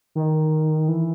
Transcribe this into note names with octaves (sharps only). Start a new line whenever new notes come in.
D#3
E3